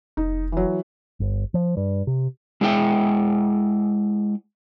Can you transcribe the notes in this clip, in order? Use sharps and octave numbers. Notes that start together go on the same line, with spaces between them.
F1 D#4
E3 F#3
G1
F3
G2
C3
G#3 E4 G#4 E5 G5